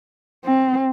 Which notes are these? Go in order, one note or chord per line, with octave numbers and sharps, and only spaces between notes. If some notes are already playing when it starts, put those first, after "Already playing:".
C4